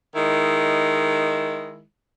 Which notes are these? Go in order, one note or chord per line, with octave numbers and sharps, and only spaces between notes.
D#3 G#3 E4